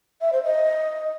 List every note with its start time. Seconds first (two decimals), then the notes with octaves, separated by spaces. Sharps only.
0.21 E5
0.32 C5
0.44 D#5